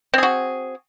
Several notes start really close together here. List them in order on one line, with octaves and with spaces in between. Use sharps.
C4 G#4 F#4